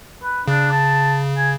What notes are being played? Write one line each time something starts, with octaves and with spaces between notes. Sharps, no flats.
B4
C#3 D4
A5
G#5